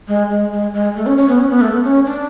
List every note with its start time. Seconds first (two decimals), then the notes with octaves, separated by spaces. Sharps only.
0.08 G#3
0.30 G#3
0.52 G#3
0.74 G#3
0.95 A3
1.06 C#4
1.17 C#4
1.29 B3
1.39 C#4
1.50 B3
1.61 A3
1.73 B3
1.84 C#4
2.06 D4